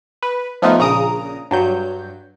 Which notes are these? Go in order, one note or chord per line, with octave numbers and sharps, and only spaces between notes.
B4
F3 A3 B3 D#4 F4
A#1 C#3 A#5 D#6 D7
G2 F#3 G6